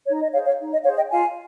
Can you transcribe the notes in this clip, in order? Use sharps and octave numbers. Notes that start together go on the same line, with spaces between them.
D#4 C#5
D#5
G#4 C5 C#5 F5
C#5 F5
D#4
D#5
G#4 C5 C#5 F5
D#5 G5
F4 F5 G#5